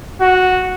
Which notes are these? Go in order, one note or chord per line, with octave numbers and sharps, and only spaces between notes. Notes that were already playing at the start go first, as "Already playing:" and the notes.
F#4